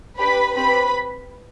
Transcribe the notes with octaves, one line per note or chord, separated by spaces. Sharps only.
D4 G4 B4 B5
C4 G4 B4 B5